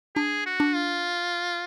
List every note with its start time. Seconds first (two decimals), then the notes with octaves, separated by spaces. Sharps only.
0.15 D4 G#4
0.46 F#4
0.60 D4
0.75 F4